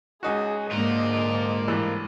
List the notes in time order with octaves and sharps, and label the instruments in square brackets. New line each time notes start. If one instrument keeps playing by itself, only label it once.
[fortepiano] C#2 D#4 F#4 [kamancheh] G#4
[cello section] G#2 D3 A#3 [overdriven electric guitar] F4 A#4 [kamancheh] D#5 D6
[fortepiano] C2 A2 E3